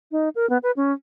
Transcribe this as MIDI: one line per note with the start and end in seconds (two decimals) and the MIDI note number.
0.12 0.29 63
0.35 0.49 70
0.50 0.58 59
0.63 0.71 71
0.77 0.92 61